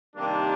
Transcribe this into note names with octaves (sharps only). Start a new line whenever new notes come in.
C3 D#3 G3 A#3 D4